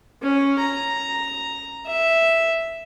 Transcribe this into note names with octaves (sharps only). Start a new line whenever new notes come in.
C#4
A#5
E5